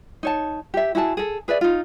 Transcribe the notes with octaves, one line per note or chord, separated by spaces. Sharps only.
D#4 C#5 A5
G4 E5
E4 F#4 G#4 A5
G#4 A4
G#4 B4 D5 E5
D#4 F4